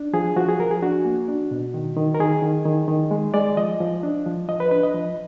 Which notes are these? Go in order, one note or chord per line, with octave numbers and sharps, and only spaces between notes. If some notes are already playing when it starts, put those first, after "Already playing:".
Already playing: D4
F3 G#4
F3 F#4
G#4
F3 A#4
G#4
D4 F#4
A#3
D4
B2
D#3
D#3
A#4
D#3 G#4
D#3
D#3
D#3
G#3
G#3 D5
F3 D#5
F3
D4
F3
F3 D#5
B4
D4 B4
D#5
F3